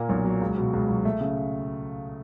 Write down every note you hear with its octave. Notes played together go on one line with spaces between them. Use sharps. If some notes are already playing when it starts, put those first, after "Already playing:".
Already playing: A#2 A#3
B1
F#3
C#2
B2
C#2
F#3
A3
C#3